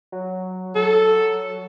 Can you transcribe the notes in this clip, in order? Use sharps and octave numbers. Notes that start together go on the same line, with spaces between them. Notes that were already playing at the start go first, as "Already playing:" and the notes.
F#3
F#3 A4